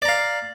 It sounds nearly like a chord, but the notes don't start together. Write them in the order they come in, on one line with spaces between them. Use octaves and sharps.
D5 A#5 F5